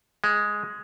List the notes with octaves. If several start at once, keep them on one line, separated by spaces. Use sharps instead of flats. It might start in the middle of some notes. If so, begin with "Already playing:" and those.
G#3